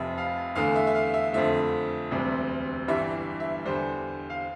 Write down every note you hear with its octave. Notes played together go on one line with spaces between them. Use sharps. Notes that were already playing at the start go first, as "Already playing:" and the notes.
Already playing: F1 F2 C3 E5
F5
E2 D3 A3 F5
E5
E5
F5
E5
F2 D3 F3 A3 E5
E1 D2 C3 G3
G1 G2 E3 G3 E5
E5
E2 D3 G3 C5
F5